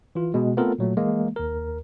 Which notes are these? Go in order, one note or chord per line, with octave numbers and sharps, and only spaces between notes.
E3 F4
B2 G#3
A3 B3 C4 F4 A4 A#4
A#2 F#3 A3
E3 G#3 A#3
D#2 A#4